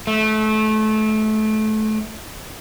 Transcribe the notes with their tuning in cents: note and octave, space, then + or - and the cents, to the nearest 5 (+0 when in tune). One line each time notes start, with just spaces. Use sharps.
A3 -25